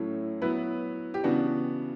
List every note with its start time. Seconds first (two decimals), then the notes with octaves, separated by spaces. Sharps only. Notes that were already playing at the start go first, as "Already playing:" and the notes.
Already playing: A2 F#3 A3 C#4 E4
0.41 F#3 B3 E4 B4
1.14 G4
1.24 C#3 E3 B3 D4 F#4